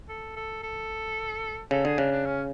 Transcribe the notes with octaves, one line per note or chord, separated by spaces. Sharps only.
A4
A4
A4
C#3 A4
D3 G#4
C#3 D4
D4
C#4